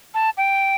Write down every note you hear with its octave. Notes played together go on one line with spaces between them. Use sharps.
A5
G5